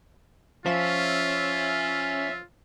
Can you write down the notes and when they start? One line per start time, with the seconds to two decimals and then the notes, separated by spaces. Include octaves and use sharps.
0.66 F3 C#4 F4 E5